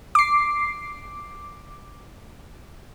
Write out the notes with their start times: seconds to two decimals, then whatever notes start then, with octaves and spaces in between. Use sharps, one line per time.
0.15 D6 C7